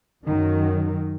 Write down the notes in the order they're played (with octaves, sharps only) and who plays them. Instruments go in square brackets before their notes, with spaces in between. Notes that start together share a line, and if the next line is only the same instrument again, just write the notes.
[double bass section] F#2 D#3 F#3